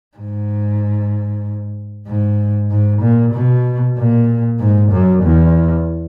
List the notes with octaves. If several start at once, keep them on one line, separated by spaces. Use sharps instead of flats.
G#2
G#2
G#2
A#2
B2
A#2
G#2
F#2
E2